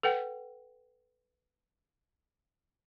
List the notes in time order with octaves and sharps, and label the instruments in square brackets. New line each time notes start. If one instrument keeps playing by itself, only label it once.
[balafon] A4 B4 F#5 G5